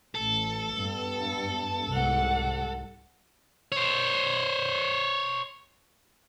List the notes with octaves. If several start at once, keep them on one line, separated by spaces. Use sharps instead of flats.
A1 A4
G2 B3
C2 G#2 F#5
C5 C#5